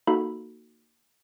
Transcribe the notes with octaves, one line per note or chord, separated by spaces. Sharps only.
A#3 D#4 F#4 A4 B5